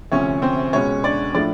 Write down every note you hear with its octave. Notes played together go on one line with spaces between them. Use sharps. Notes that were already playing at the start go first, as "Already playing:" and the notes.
D2 C3 F3 C#4 C#5
C4 C5
C#2 B2 G#3 C#4 C#5
D4 D5
A2 F3 A3 D4 D5